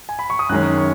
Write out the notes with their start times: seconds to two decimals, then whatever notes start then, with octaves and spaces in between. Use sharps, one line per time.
0.09 G#5
0.19 B5
0.30 C#6
0.39 D#6
0.49 F#2 D#3 G#3 C#4 F#6
0.78 C#6